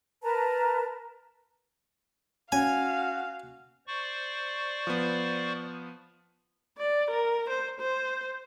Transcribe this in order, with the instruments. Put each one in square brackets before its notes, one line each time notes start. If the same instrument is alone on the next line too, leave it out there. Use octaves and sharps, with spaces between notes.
[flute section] A#4 B4 A5 A#5
[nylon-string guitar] C#4 [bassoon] F#4 [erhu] F5 [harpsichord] G#5
[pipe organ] C5 D5 C#6
[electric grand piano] F3 B3
[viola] D5
A#4
C5
C5